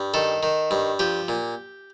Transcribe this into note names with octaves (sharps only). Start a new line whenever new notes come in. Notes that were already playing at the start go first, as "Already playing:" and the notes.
Already playing: G2
D#3 A4
D#3
G2
F3 G4
A#2